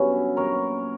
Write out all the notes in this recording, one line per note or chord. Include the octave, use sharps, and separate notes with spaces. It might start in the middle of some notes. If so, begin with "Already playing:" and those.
Already playing: G2 D3 F#3 B3 C#4 E4
A#2 F#3 A#4 C#5